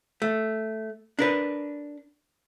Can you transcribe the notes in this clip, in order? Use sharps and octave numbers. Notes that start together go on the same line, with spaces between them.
A3
D4 A#4 B4